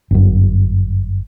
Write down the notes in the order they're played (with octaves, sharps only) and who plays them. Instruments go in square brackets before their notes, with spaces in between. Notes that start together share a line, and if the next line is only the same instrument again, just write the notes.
[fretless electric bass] G1 F#2